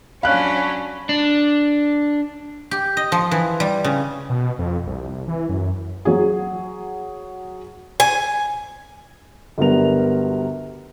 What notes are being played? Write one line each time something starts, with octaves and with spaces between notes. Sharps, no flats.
F#3 C#4 D4 F5 B5 F#6
D4
G4
D#5
F3
E3
G3
C#3
B2
F2
C2
E3
F#2
F#3 G#4
G#5
G1 F#3 G3 B3 A#4 F7